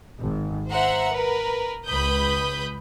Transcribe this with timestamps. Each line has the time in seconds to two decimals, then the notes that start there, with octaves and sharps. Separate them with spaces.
0.20 G#1
0.71 C5 E5 F#5 A#5
1.12 A#4 B4
1.87 C#2 B4 B5 D#6 G6